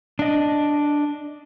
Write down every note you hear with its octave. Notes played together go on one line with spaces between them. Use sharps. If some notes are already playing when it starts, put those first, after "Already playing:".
D4 D#5